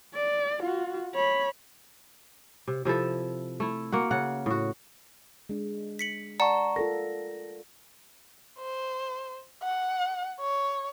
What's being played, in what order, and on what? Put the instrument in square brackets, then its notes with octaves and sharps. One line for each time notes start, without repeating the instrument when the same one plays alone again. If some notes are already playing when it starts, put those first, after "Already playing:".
[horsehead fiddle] D5
F4 F#4
C#5 B5
[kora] C3
C3 F3 E4 A4
A3 E4
A#3 F#4 F#5
C#3 F#5
A2 F#4
[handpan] G#3 D4
[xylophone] B6 C#7 F#7
[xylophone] D5 F#5 A5 [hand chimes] A#5 C#6
[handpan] F4 A4 A#4 [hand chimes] A#6
[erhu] C5
F#5
C#5